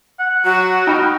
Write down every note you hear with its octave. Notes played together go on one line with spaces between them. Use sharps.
F#5
F#3 F#4
D#4 F5 G5 B5